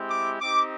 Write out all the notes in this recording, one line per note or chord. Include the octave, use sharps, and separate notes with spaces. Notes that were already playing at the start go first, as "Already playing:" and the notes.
Already playing: G#3 C4 E4 G4
D6
C4 D#4 G4 D6